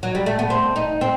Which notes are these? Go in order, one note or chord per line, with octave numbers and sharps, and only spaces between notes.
F#3
G3
A3
B3
C4
D#4
C4